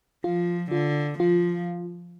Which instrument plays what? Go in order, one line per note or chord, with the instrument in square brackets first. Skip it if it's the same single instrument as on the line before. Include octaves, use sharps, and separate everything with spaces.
[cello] F3 [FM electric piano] F4
[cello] D3 [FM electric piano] F4
[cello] F3 [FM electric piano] F4